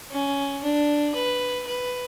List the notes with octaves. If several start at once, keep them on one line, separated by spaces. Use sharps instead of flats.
C#4
D4
B4
B4